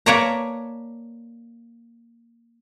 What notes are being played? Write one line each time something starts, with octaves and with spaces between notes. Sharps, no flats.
A#3 B4 C#5 D5 A5 A#5